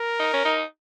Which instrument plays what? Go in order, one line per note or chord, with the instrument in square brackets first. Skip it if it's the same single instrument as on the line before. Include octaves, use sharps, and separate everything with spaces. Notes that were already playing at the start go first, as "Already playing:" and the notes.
Already playing: [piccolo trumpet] A#4
[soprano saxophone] D#4
C#4
D#4